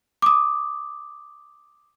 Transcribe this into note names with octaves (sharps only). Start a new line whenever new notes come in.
D6 D#6